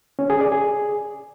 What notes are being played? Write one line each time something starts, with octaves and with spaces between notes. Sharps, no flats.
C#4
G#4
D5
G#4